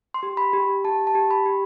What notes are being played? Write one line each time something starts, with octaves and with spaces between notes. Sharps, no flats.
C6
G4
B5
G4
G4 A5
A5
G4
B5
G4